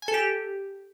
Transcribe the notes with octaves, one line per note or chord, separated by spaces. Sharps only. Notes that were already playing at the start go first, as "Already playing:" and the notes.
G#5
A4
G4